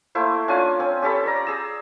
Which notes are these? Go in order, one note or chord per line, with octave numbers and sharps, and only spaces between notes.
A3 A#3 E4 C5
C#4 D4 F4 G#5
C4 C#4
C#4 G4 A4 B5
D5 A#5
G#4 E6